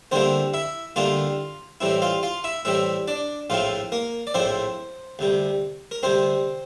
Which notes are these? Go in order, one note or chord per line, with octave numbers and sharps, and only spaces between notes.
D2 D3 G3 A#3 C4 E4 C5
E4 E5
D2 D3 G3 A#3 E4 F4 F5
A2 E3 G3 C4 E4
F4 F5
F4 F5
E4 E5
A2 E3 G3 C4 E4 E5
D4 D5
A#1 A2 F3 C4 E4 F4 F5
A#3 A#4
D5
A#1 A2 F3 C4 E4 C5
D2 C3 G3
A#4
D2 C3 G3 C4 C5